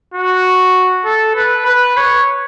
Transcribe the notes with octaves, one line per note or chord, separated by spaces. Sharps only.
F#4
A4
B4
B4
C#5